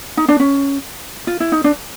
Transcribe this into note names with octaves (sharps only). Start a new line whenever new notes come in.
D#4
D4
C#4
F4
E4
D#4
D4